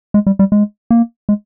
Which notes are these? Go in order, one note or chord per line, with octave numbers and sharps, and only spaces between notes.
G#3
G3
G3
G#3
A#3
G#3